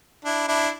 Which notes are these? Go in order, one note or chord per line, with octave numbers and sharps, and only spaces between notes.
D4 E4
D4 E4